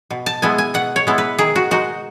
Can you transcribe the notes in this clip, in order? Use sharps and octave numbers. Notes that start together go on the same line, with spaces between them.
B2
A5
G#3 B3 E4 G#5
G#5
B2 F#5
C#5
G#3 B3 E4
B4
D#3 G#4
F#4
G#3 D#4 F#4